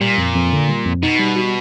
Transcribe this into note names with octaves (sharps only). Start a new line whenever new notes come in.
A#2 G3
F2
F2
D3
G3
F2
B2 D#4
G3
F#4